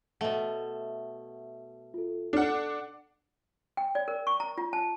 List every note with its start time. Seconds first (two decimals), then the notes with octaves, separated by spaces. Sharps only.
0.21 B2 A3 D#5 E5 F#5
1.94 F4 A4
2.33 D4 A4 F#5
3.77 G5
3.95 D5
4.08 A#4
4.27 C#6
4.40 A#5
4.58 F4
4.73 A5